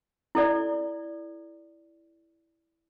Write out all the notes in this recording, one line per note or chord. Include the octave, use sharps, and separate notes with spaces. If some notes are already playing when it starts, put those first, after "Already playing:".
E4 A4 D5